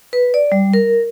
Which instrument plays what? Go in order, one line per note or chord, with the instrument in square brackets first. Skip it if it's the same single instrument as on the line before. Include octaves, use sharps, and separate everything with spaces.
[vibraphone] B4
D5
G3
A#4